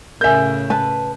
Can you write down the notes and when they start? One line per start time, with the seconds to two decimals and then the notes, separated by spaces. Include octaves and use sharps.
0.21 A2 C#3 A#4 E5 G#5 G6
0.70 B4 A5